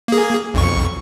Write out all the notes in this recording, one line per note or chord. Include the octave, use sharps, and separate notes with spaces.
A#3 G#4
B1 F2 C#6